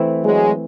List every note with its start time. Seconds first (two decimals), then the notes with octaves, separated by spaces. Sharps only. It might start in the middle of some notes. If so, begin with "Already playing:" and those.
Already playing: E3 A3 C4 E4
0.23 F#3 G#3